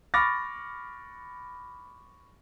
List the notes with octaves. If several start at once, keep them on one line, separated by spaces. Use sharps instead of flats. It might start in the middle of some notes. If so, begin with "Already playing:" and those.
B5 C#6 D6 F6 A6 A#6